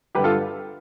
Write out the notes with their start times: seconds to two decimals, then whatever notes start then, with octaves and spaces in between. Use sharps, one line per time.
0.15 G2 D3 G3 G4 B4
0.24 F4 A4